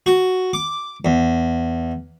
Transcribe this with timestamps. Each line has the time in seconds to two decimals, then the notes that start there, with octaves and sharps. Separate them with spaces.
0.06 F#4
0.53 D6
1.05 E2